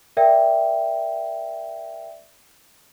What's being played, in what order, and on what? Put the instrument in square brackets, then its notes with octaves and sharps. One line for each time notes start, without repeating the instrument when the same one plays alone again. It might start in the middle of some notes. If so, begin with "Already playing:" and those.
[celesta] A#4 D5 E5 G5